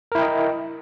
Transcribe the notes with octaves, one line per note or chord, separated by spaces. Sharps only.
E4 A#4 D#5 G5